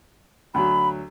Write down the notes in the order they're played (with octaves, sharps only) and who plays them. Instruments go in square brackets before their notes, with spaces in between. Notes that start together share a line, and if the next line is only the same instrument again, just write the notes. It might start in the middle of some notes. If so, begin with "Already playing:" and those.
[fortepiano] D2 F#3 [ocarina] B5